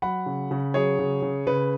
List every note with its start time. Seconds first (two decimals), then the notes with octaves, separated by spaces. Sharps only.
0.02 F#3 F#5 B5
0.26 C#3
0.51 C#3
0.74 F#3 G#4 C#5
0.99 C#3
1.22 C#3
1.47 C#3 B4